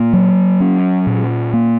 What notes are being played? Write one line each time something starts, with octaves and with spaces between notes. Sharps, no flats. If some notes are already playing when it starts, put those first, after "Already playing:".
Already playing: A#2 A#3
F#3
C#4
A#2
A#3